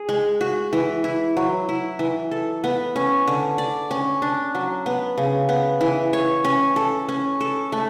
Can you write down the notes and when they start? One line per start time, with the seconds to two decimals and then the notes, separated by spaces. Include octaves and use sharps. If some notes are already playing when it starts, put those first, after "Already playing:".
Already playing: G#4
0.09 G#3
0.41 F#4
0.73 E3
1.04 E4
1.37 F#3
1.69 E4
1.99 E3
2.31 A4
2.64 B3
2.96 C#4
3.27 D3
3.58 D5
3.91 C#4
4.22 D4
4.55 F#3
4.86 B3
5.18 C#3
5.49 B3
5.81 E3
6.13 C#5
6.44 C#4
6.76 A4
7.09 C#4
7.41 A4
7.72 A3